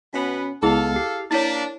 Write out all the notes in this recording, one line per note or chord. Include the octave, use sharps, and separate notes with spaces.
B2 B3 C#4 B4
C#2 G#3 B3 E4 G#4 A4 F5
G4 C7
A#3 D4 E4 C#5 A6 B6